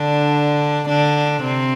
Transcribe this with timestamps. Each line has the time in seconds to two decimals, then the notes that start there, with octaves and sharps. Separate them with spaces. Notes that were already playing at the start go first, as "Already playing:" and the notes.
Already playing: D3 D4
0.88 D3 D4
1.43 C3 C4